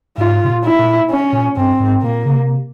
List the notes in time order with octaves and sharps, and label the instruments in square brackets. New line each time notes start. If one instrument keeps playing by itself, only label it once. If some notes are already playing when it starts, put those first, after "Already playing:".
[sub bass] G#2 [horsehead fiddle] F4
[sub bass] C3
A#2
[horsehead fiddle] E4
[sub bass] A#2
[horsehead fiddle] C#4
[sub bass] A#2
[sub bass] G2 [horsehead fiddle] C4
[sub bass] G#2
[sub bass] A#2 [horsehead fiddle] A#3
[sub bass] C#3
C3